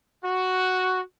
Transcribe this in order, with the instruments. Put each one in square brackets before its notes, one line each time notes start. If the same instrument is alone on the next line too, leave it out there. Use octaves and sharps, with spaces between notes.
[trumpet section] F#4